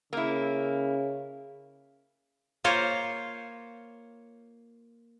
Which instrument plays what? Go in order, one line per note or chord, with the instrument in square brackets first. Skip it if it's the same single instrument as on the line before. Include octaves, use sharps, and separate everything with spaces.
[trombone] C#3 [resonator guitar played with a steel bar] A#3 E4
[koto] A#3 F4 C5 C#5